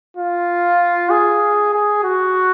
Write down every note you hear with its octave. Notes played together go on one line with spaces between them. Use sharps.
F4
G#4
G#4
F#4